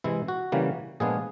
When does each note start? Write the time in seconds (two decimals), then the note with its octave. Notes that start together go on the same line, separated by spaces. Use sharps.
0.04 C3 E3 G#3 E4
0.28 F#4
0.52 C#3 E3 G3 A#3
1.00 A#2 F3 G#3 B3 D4 G#4